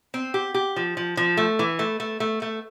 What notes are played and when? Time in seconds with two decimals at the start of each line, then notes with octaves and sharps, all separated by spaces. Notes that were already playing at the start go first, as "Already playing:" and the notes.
0.14 C4
0.34 G4
0.54 G4
0.76 F3
0.97 F3
1.17 F3
1.37 A3
1.59 E3
1.79 A3
2.00 A3
2.20 A3
2.42 A3